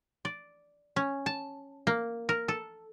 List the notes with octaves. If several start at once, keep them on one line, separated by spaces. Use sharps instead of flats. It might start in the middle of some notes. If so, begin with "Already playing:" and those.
D5
C#4
A5
A#3
A#4
A4